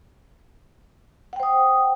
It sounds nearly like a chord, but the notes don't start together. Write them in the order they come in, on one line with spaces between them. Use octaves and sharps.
F#5 G5 C5 D#6